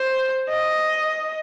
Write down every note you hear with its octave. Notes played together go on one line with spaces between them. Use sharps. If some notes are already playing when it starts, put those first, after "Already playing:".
Already playing: C5
D#5